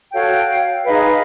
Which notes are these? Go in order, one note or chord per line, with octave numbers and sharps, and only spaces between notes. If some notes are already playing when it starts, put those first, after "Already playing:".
F#4 A4 C#5 F5 G5
D#4 G#4 B4 D#5 F5